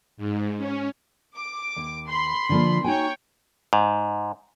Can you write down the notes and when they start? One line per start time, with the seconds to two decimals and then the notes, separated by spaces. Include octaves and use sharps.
0.17 G#2
0.58 C#4
1.35 D6
1.76 D#2
2.08 B5 C6
2.49 D3 F3 A#3
2.84 D#4 F#4 C#5 G5 G#5
3.73 G#2